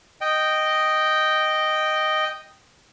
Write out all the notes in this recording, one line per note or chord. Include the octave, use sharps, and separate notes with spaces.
D#5 G5